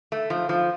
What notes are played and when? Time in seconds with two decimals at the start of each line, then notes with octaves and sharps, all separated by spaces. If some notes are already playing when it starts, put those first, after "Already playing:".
0.12 A3
0.30 F3
0.49 F3